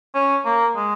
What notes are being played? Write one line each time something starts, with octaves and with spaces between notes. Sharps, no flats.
C#4
A#3
G#3